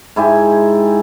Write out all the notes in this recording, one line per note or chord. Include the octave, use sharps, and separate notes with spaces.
G#2 E4 G4 G#5